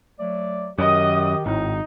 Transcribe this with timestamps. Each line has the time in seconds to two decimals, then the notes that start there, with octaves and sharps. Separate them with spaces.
0.20 F#3 A3 D5
0.78 F#2 D#3 G4 D#5 D#6
1.46 G#1 A2 D#4